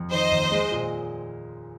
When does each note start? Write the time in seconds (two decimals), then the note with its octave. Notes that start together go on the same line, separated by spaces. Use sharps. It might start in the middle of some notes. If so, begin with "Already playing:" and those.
Already playing: F2
0.11 D#3 C5 D#5
0.32 D#2
0.52 G#3
0.71 A#2